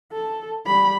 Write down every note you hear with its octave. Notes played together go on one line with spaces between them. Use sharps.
A4
G3 B5